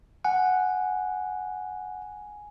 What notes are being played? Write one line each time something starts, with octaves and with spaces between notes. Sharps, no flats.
F#5 G#5